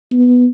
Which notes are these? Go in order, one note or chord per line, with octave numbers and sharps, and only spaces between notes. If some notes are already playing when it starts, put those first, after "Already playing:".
B3